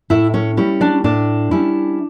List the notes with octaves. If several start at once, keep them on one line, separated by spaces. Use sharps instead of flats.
A2 E4 E5
C#4 C#5
G3 C#4 E4
D4 D5
A2 D4 D5
G3 C#4 E4